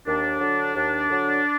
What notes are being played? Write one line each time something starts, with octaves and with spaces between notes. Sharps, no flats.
D#2 D4
D3 F#3
D#2
D3 F#3